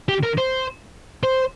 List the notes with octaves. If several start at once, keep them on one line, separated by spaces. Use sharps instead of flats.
G4
A#4
C5
C5